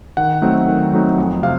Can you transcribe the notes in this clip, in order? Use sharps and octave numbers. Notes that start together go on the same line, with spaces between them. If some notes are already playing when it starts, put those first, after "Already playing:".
D#3 F#5
F#3 A3 C4 D#4
D#3
F#3 A3 C4 D#4
F2
C3 F5